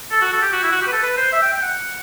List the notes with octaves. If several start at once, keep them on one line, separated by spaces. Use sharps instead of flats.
A4
F#4
A4
G4
F#4
E4
F#4
G4
B4
A4
B4
C5
E5
G5
G5
F#5